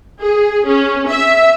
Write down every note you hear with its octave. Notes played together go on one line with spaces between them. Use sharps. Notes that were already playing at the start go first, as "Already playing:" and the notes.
G#4
C#4
E5